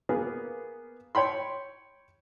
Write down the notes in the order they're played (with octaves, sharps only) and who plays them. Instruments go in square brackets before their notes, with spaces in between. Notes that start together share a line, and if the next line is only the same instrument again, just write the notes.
[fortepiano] A#3 B3 G#4 A#4
C#5 G5 B5 C6